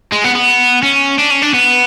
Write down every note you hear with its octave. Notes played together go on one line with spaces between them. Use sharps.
G#3
B3
B3
C#4
D4
C#4
D4
B3